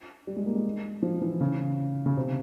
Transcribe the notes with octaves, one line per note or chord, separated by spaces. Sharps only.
G3
G#3
A#3
G#3
F3
E3
C#3
C#3
C3